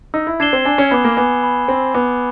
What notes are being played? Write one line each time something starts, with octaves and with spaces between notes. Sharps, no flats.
D#4 E6
E4
D4 G#6 C7 E7 G7
C4
D4 G#5
C#4
B3 B5 D6
A#3
B3 G#5
B5 D6
C4 G#5
B3 B5 D6